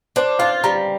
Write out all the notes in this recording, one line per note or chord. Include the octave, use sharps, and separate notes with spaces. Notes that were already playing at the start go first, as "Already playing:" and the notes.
D4 C5
F4 F5
G3 A#5